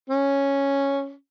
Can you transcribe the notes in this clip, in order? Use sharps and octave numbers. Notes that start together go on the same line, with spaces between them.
C#4